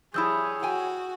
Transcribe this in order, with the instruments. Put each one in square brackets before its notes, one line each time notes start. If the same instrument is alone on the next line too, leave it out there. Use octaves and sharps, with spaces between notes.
[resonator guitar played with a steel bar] F3 G3 E4 [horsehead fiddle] G#4 C#5 [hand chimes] D#6 E6 G6
[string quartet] F#4 [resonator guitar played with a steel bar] G5 G#5